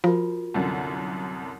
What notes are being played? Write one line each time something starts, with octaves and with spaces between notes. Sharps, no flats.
F3 F4 F#4 A#4
C2 F#2 D3